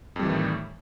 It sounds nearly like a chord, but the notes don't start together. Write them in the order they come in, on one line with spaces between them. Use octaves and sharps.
F2 G3 E3 D#3 A2